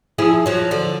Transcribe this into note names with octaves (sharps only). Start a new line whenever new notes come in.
F3 E4 G#4
F3 F#3
D3 F3